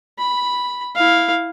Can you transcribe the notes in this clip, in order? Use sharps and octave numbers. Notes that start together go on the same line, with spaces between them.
B5
E4 F5